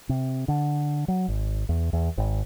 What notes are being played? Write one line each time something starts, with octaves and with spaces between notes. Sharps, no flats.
C3
D3
F#3
G#1
E2
E2
G#1